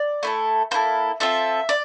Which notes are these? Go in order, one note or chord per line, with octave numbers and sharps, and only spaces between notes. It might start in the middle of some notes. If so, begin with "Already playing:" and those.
Already playing: D5
A3 E4 A4
A#3 E4 A4 C5
C4 F4 A4 E5
D5